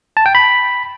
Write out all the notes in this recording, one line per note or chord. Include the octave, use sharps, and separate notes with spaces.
A5
G5
B5